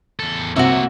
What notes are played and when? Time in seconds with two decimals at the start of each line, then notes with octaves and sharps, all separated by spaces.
0.20 E2 A4
0.56 C2 C3 A#3 F#4 C#5 E5